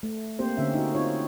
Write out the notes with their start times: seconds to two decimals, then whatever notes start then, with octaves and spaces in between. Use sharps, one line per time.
0.03 A3
0.39 A#3 C4 G4 C5
0.57 D3 C4 C#4 E5
0.74 D#4 F#4
0.95 C4 D#4 F4 C#5